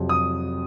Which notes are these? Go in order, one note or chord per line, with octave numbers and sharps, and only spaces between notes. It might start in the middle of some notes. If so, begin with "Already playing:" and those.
Already playing: F2 C3 F#3
D#6